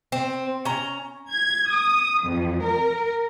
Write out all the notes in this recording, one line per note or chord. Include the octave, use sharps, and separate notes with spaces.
C4
C#4 A#5
G#6
D#6
F2
A#4